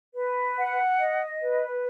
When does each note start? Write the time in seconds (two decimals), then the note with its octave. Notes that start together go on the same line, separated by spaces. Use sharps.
0.15 B4
0.57 F#5
0.99 D#5
1.41 B4